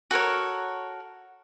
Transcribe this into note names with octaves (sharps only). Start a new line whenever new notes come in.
F#4 A4 A#4 C#5